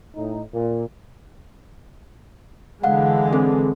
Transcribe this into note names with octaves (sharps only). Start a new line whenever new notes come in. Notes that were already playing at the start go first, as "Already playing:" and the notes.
A2 D#4
A#2
D3 E3 G#3 F5 F#5
C4 G#4 A4